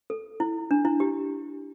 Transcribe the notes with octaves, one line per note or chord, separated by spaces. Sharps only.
A4
E4
D4
E4
G4